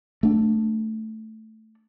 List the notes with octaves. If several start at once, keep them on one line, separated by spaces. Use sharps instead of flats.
A3 D4